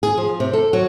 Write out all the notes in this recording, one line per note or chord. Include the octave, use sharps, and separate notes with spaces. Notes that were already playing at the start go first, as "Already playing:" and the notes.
G#4
F3
C3
A4
F#3